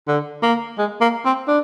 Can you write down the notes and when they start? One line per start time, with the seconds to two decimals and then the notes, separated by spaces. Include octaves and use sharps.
0.08 D3
0.43 A#3
0.78 G#3
1.01 A#3
1.25 C4
1.48 D4